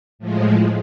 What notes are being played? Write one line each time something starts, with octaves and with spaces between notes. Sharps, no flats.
A2 F3 G#3